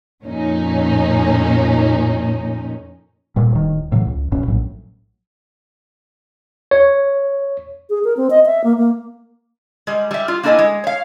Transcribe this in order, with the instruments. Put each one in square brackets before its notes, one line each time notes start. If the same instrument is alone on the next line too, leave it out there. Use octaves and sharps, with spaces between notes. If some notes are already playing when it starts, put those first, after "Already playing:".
[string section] F2 A#2 C#4 D#4
[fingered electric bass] A#2 G3
D1 D#3
A2 C#3 E3 F#3
C#2
F1 F#2 B2 C#4
A#1 A2 F#3
[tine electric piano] C#5
[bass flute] G#4
A#4
C4
D#5
E5
A#3
A#3
[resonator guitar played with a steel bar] G3 G#3
G3 E5
F4
A#3 D4 E4 A4 D#5 G#5
G#3
C#5 F5